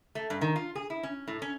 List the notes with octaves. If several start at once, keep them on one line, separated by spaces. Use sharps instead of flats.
A3
G2
D#3
F4
G#4
E4
C#4
A2
C#4